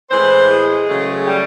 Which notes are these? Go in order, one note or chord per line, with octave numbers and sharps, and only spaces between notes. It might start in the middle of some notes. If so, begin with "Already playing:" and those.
A2 E3 G#3 C4 C5
G#3 G#4
C#3 F#3 A3
G3 G4